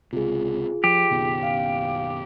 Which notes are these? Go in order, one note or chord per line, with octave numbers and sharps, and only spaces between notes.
C#2 C3 F4 G#4
F3 G4
F#1 B2 D#3
F5